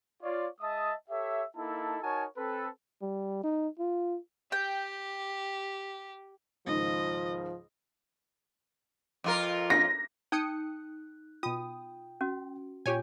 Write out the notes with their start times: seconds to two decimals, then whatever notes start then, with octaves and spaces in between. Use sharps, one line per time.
0.23 F4 C#5 D5
0.60 G#3 D#5 E5 A5 D#6
1.10 G4 A4 C#5 E5
1.56 A#3 D#4 E4 A4 A5
2.02 D#4 F#4 A#4 C#5 G#5 A5
2.37 C4 A4 B4
3.02 G3
3.43 D#4
3.79 F4
4.52 G4 G5
6.67 C#2 G#2 D#3 F3 D#5
9.24 F2 F4 A#4
9.70 A#6
10.32 D#4 G5 D#6 F#6 C#7
11.43 B2 F4 G5 D#6
12.21 C#4 F#4
12.86 A#2 F4 G4 C#5 G#5 G6